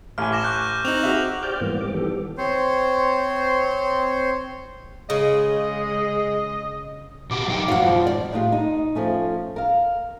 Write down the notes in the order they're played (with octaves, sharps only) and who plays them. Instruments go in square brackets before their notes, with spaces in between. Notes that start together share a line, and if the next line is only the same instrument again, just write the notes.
[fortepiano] A1 G#5 [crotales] F6
[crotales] D6 A#6 E7
C#6 F#6 G6
[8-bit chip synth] C4 D#4 [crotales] F7 F#7
[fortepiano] F#4 G#4 E5
[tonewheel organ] G4 C5 D5 D6 F6 G6
G#2 E3 G3 A#3 B3
C4 D6
D#3 E3 G3 B3 G4 A4
[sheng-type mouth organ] C4 C5 C#5
[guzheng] C#3 [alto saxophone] G#3 [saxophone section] D#5
[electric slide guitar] B2 F#4 G4 [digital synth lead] D6
[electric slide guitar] F#2 D#4 G5
[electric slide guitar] F2 G#2 [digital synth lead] F#3 [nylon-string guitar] F5 F#5
[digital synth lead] F3
[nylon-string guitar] D5
A2 G#3 F4 G4
D#4
F3 A3 C#4
A#4 F5